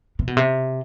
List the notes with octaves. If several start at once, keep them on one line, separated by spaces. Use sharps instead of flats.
C3
B2
C3